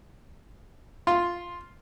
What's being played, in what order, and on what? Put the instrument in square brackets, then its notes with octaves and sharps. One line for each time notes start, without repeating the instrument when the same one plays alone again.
[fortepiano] F4 [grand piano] C6